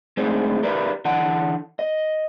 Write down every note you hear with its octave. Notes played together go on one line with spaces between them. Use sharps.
G#3 A3 C4 D4 D#4 G#4
E4 G4 A#4 B4 D5
D3 E3 F#5 A5
D#5